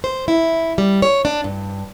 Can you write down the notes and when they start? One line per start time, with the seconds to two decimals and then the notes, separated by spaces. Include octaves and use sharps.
0.04 C5
0.28 E4
0.78 G3
1.02 C#5
1.25 D4
1.44 G2